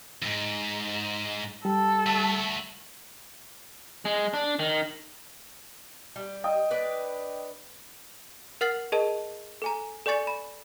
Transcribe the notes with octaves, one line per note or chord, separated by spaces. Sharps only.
E2 G#2 A#6
G3 A4
A3 F#4
G#3
D4
D#3
G3
D#5 G5 D#6
D4 B4 D5
A#4 F#5 F6 A6 C7 F#7
G#4 A#4 D#5 A5
A4 G#5 A#5
A4 D5 G#5 C#6 A6 C#7
B5